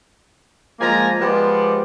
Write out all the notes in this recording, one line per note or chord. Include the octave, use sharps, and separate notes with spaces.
F3 G#3 A#3 G#5 A#5
F3 G#3 B3 G4 C5 D5